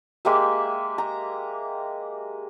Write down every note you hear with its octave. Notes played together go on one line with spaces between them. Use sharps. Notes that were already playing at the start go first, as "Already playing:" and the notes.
G#3 A#3 G4 E5
A#5